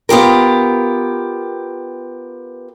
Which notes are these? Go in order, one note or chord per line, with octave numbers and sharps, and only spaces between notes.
B3 F4 G4 A#4